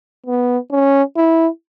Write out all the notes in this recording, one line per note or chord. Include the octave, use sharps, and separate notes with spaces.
B3
C#4
E4